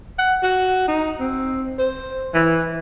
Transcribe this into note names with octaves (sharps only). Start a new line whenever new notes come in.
F#5
F#4
D#4
C4
C5
E3